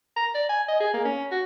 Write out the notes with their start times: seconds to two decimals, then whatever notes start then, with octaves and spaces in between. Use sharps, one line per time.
0.17 A#5
0.35 D5
0.49 G#5
0.68 D#5
0.80 G#4
0.94 A#3
1.05 C#4
1.32 F#4